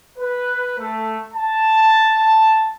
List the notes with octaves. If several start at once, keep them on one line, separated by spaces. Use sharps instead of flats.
B4
A3
A5